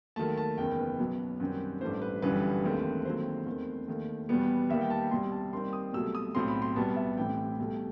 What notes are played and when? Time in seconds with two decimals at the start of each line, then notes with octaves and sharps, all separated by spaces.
0.16 D#2 D#3 F#3 A3 A5
0.37 A5
0.58 F#1 E2 D#3 G5
0.79 B4
0.99 B1 B2 F#3
1.40 F#2 D#3 G3 C4
1.81 A1 G2 E3 A3 C5
2.02 B4
2.22 G1 F#2 E3 G3 B4
2.64 E1 D#2 D#3 A3 C4
3.05 D#2 D#3 F#3 A3 C4 C5
3.46 E2 D#3 A3 C4
3.87 D#2 D#3 A3
4.29 E2 B2 G3 B3
4.69 D#2 D#3 G3 B3 E5
4.81 G5
4.90 A5
5.11 C2 B2 G3 C6
5.32 A5
5.53 D#2 D#3 G3 C4 C6
5.73 D#6
5.93 C2 B2 F#3 A3 E6
6.15 D#6
6.35 B1 A2 F#3 C4 C6
6.48 B5
6.62 C6
6.76 C2 B2 G3 B3 A5
6.96 E5
7.17 A1 A2 E3 A3 C4 G5
7.59 C2 B2 A3